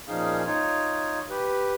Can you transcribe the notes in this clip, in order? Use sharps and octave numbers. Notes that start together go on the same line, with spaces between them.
A#2 F3 C#4 D#4 G#4 F5
D#4 F4 C#5
G4 B4